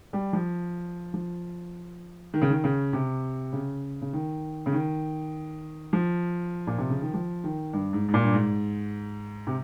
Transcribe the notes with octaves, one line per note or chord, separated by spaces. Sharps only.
G3
F3
F3
D#3
C#3
D#3
C#3
C3
C#3
C#3
D#3
C#3
D#3
F3
A#2
C3
C#3
D#3
F3
D#3
G2
G#2
G#2
A#2
G2
G#2
C3